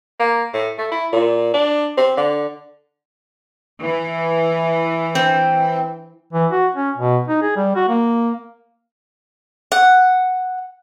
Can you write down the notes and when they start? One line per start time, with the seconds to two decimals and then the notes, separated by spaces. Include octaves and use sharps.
0.19 A#3
0.53 A2
0.78 A3
0.91 E4
1.12 A#2
1.54 D4
1.97 C4
2.17 D3
3.82 E3
5.15 C4
6.33 E3
6.52 F#4
6.75 C#4
6.97 B2
7.28 D#4
7.42 G#4
7.56 G3
7.76 F#4
7.88 A#3
9.72 F#5